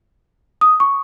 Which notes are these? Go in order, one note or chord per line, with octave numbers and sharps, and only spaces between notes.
D#6
C#6